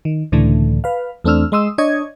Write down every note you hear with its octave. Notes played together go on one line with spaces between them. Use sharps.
D#3
C#2 A2 D3 E3 A3
B4 F5
E2 A3 C4 D4 E6 F6
G#3 D#5 C6 D#6 E6
D4 C#5 D#5 G#6